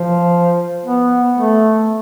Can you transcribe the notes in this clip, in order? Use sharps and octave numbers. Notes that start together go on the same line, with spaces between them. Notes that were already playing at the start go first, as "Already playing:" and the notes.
Already playing: F3
B3
A3